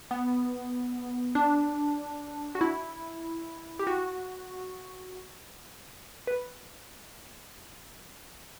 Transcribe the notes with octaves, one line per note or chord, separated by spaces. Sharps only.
B3
D4
F#4
E4
G4
F#4
B4